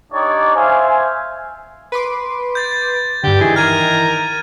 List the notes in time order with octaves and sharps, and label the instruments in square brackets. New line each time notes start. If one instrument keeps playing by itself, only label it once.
[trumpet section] D4 D#4 G4 C#5 D5
C5 E5 F5 G#5
[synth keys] B4 C6 D6
[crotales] G6 A6
[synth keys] G2 D3 [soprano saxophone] G4
[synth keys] D#3 E3 [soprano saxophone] G#4
[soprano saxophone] A#4 [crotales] F6 G#6 D#7